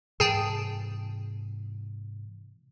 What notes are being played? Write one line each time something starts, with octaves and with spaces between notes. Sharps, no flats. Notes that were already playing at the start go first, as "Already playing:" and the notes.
G#2 C3 E3 G#4 G5 A5